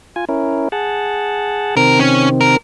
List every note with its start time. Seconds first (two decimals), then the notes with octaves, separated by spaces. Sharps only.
0.16 F4 G#5
0.29 C#4 E4 A#4
0.72 G#4 F#5 A5
1.77 C3 D#3 C4 A#4
1.99 C#4
2.41 A#4